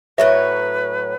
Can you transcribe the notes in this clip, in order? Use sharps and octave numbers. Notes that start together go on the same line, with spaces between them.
A2 F#3 B4 C#5 E5